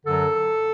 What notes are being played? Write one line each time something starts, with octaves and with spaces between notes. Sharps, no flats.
F#2 D3 F#3 A4